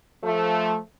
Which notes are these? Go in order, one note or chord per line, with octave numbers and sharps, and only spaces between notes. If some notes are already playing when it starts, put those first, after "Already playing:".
F3 A3